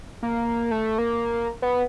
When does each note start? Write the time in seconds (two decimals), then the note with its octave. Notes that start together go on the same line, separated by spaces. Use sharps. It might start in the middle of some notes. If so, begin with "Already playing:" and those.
0.23 A#3
0.71 A3
0.98 A#3
1.62 B3